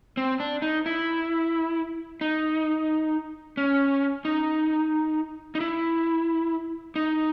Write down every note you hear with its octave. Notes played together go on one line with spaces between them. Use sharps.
C4
D4
D#4
E4
D#4
C#4
D#4
D#4
E4
D#4